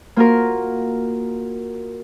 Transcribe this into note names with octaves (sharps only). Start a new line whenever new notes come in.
A#3 F4 F#4 A#4